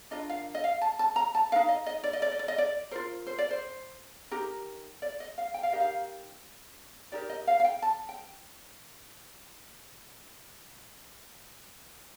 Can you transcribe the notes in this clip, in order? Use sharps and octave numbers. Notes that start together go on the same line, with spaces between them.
D4 F4 A#4 D#5
F5
D#5
F5
A5
A5
A#5
A5
A#4 F5
D#4
D#5
D#5
D5
D#5
D5
D#5
D5
D#5
D5
F4 A#4 C5
C5
D5
C5
D#4 G4 A#4
D5
D#5
F5
G5
F5
D#4 G4 A#4 D#5 F5
D#4 G4 A#4 D5
D#5
F5
F5
G5
A5
G5